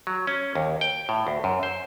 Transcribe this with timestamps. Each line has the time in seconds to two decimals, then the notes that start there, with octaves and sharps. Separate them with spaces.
0.07 F#3
0.27 C#4
0.55 D#2
0.81 G5
1.09 A2
1.27 D2
1.44 F#2
1.63 C5